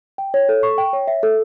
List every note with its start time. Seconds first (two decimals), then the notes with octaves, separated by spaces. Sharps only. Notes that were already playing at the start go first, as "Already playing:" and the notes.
0.18 G5
0.34 C#5
0.49 A4
0.63 C#6
0.78 G5
0.93 C#5
1.08 E5
1.23 A4